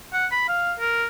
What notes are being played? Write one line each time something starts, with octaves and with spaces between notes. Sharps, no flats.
F#5
B5
F5
A#4